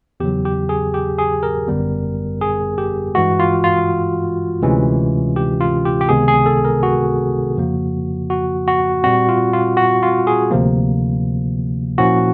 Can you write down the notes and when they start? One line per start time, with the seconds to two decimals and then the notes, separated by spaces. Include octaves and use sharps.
0.20 E2 C#3 F#3 G4
0.45 G4
0.69 G#4
0.94 G4
1.18 G#4
1.43 A#4
1.68 G1 F#2 D3 G3 B3
2.41 G#4
2.78 G4
3.15 G2 E3 G#3 F#4
3.39 F4
3.64 F4
4.62 D2 C3 E3 G#3 C#4
5.36 G4
5.60 F4
5.85 G4
6.01 G4
6.09 C#2 C3 D#3 G#3 B3 G#4
6.28 G#4
6.46 A4
6.65 A#4
6.83 F#4
7.57 F2 C#3 F3 A#3
8.30 F#4
8.67 F#4
9.04 A#2 G3 C4 F#4
9.29 F4
9.53 F4
9.77 F#4
10.03 F4
10.27 G#4
10.50 D2 C3 F3 A#3
11.98 A#2 F3 A#3 C#4 E4 F#4